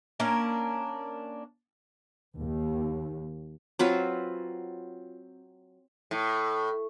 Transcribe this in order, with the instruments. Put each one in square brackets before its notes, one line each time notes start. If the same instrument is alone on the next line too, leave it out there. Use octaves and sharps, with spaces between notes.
[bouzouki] A#3 C#4 D4 A#4
[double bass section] D#2
[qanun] F#3 C4 F4 B4
[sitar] A2